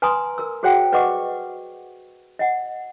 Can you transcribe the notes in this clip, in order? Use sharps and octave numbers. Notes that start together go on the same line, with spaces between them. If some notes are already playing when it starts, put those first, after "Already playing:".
B4 G#5 A#5 C6 D#6
A#4 E6
F#4 G#4 C5 D5 F#5 G5
B4 D5 D#5 F#5 C#6 D6
D#5 F#5